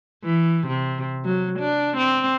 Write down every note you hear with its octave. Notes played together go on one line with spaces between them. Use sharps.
E3
C3
F#3
D4
C4